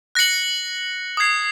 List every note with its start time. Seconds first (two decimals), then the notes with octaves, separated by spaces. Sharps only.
0.15 F#6 A#6 C#7 F#7
1.17 D#6 G#6 C7